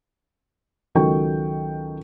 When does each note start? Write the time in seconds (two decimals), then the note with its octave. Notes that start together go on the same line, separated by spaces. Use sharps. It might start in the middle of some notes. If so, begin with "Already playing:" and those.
0.95 C#2 D#3 F#3 A4 G5 C#6